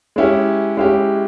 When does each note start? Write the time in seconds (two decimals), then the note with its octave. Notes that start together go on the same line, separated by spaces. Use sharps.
0.16 G#3 C#4 E4 G4
0.77 G#3 C#4 E4 G4